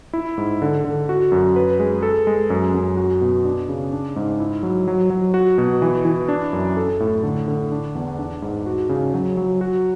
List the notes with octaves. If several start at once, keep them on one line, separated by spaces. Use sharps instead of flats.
E4
G#2
D3
D3
F#4
F#2
B4
G#3
A4
G#3
F#2
F#2
F#4
B2
D4
C#3
D4
G#2
E4
F#3
F#3
F#3
F#4
B2
E3
E3
D4
F#2
A4
A2
D3
D3
D4
E2
D4
G#2
F#4
C#3
F#3
F#3
F#4